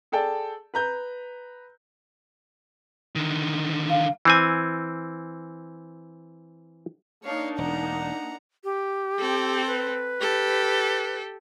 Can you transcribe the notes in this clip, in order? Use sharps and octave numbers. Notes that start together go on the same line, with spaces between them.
G#4 A4 D5 G5 A5
B4 A#5 G6
D3 D#3
F5
E3 C4 G#5
A#3 D4 D#4 C#5 F5
E1 F#5 A#5
G4
C4 A4
B4
G4 A4